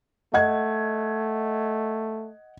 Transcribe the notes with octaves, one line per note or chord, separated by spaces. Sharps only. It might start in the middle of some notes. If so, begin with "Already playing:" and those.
A3 D#5 F#5 G#6